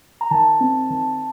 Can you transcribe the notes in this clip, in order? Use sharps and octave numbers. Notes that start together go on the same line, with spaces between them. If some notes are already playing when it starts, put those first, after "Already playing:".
A#5
D#3 A5
C4
D#3